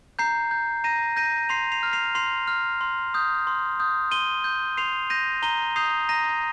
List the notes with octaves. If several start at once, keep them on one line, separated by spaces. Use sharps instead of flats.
A#5 G6 C7
G6
A#5 A#6 D#7
G6 A#6 D#7
C6 C7 F7
C7 F7
F6
C7 F7
C6 C7 F7
F6
C6
D#6 G6
C6
D#6 G6
C6 D#7 G7
G6
C6 C7 F7
G6 A#6 D#7
A#5 D#7 G7
D#6 G6 C7 F7
A#5 A#6 D#7